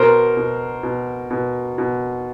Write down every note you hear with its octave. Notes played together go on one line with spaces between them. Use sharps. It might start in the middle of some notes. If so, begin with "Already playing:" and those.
Already playing: B2 A#4 C5
B2
B2
B2
B2